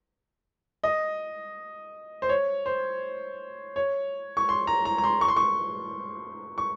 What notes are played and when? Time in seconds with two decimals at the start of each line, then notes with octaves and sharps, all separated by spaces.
0.83 D#5
2.22 C5
2.29 C#5
2.66 C5
3.76 C#5
4.37 C#6
4.49 C6
4.67 A#5
4.85 A#5
4.98 A#5
5.04 C6
5.21 C#6
5.28 C6
5.36 C#6
6.58 C#6